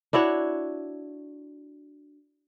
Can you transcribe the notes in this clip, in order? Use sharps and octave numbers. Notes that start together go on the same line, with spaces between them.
D4 E4 F#4 C#5